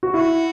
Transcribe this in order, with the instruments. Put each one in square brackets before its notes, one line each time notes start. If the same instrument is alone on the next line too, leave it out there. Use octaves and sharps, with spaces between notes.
[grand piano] F#4
[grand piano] E4 [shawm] F#4